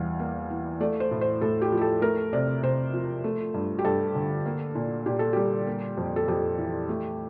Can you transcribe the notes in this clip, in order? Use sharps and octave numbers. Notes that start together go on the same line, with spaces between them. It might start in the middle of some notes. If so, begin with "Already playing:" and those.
Already playing: E2 G3 F5
A#3
E3
A3 D5
C5
A2
C5
A2 A4
G4
F3
G4
A4
A3 A#4
C3 D5
C3 C5
F3
A3
G2
G4
G2 A4
D3
A#3
A#2
A#2 G4
A4
G3 G4
A#3
F2
A4
F2 G4
E3
A3